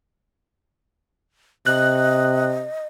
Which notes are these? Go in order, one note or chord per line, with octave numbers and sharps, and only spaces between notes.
C3 D#5 F#6